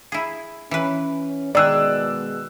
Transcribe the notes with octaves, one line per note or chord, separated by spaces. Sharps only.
E4 G#4
E3 C#4 B4
B2 D#3 G#3 G#4 D5 E6 F#6